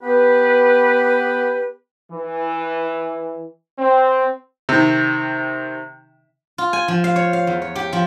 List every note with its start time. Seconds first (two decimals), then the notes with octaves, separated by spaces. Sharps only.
0.02 B3 G4 B4
2.11 E3
3.79 C4
4.69 C3 D#3
6.58 F4
6.73 G#5
6.88 F3
7.04 F5
7.16 C#5
7.33 F5
7.47 E2
7.62 C#5
7.75 G4
7.93 F3